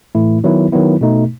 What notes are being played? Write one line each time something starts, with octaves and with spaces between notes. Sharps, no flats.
A2 E3 A3 E4
D#3 F#3 B3 E4
D#3 F#3 B3 E4
B2 A3 D#4